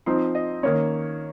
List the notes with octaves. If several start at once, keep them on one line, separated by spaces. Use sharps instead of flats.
F3 C4 D#4 C6
D#5
D#3 A#3 C#4 C#5